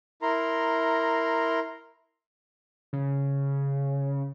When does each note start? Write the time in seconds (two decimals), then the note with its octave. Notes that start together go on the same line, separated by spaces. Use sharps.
0.22 E4 A#4 A#5 C6
2.93 C#3